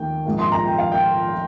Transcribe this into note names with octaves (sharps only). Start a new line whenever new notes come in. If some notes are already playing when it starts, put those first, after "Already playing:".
Already playing: D#2 D#3 A#3 G5
A#1 G#2 F3 A#3
C6
A#5
G5
F5
G5